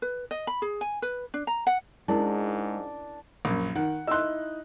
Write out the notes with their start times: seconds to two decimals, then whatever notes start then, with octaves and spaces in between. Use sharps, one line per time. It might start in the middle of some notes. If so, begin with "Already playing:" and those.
0.02 B4
0.31 D#5
0.47 B5
0.62 G#4
0.81 G#5
1.02 B4
1.34 D4
1.47 A#5
1.67 F#5
2.08 G#2 G#3 C#4 D4 E4 A#4
3.45 A#1 F#2
3.76 D#3 F#5
4.08 D#4 E4 C6 E6 F#6